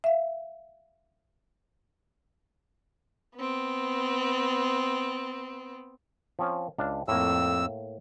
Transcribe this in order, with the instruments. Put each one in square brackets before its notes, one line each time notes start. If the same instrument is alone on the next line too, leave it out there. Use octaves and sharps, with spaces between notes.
[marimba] E5 F5
[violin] B3 C4
[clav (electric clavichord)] F3 C4 C#4
C#2 D4 F5
[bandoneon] F2 E6 [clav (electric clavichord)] A2 A#3